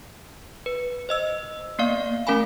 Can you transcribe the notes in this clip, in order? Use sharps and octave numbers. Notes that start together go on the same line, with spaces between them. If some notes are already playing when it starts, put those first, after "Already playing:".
B4
C5 D#5 E6
A#3 B3 D5 F5
A3 C#4 A#4 F5 G#5 B5